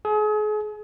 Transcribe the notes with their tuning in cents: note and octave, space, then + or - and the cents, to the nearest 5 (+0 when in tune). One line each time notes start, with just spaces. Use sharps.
G#4 +35